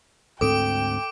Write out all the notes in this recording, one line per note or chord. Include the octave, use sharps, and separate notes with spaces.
D2 G#2 C4 A4 G5 D6 D7